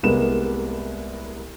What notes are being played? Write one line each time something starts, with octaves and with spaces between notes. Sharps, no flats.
C2 G#3 A#3 B3 E7